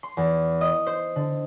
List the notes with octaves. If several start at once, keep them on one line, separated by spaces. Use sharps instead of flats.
C6
E2
D#5
C5
D3